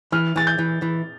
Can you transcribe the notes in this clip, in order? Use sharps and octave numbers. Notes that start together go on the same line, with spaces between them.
E3 F6
E3 A6
G6
E3
E3